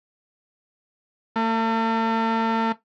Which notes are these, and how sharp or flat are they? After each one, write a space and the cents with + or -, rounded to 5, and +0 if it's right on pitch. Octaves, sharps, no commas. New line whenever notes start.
A3 +45